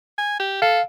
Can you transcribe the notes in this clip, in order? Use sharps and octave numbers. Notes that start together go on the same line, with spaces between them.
G#5
G4
A4 F5